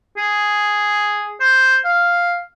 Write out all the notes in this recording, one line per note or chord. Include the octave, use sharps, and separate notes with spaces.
G#4
C5
F5